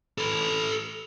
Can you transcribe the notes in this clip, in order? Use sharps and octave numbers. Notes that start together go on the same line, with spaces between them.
A4 B4